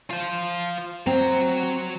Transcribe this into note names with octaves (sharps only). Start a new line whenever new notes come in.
F4 C5
F#3 C4 A#5